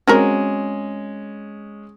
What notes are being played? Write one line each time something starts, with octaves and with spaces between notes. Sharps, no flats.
G#3 C4 C#4 F#4 A#4